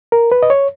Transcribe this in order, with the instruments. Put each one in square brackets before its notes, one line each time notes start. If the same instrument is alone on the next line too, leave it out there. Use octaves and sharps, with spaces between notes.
[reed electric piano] A#4
B4
D#5
C#5